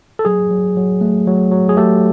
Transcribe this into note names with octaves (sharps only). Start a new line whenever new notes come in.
A4
F#3 G#4
F#3
F#3
A3
F#3
F#3
G#4
A3 G4 A4